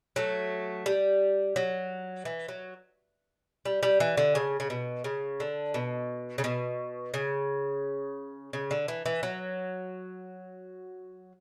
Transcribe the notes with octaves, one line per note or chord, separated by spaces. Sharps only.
F#3 A3
G3
F#3
E3
F#3
G3
G3
E3
D3
C#3
C#3
B2
C#3
D3
B2
C#3
B2
C#3
C#3
D3
E3
E3
F#3